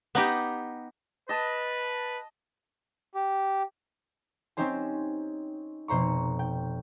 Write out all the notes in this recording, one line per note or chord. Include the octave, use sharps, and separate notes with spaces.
B3 D#4 G4
B4 D#5 A5
G4
C4 C#4 D#4 G4 C5 G#5
F1 B2 C5 A#5 C#6
G5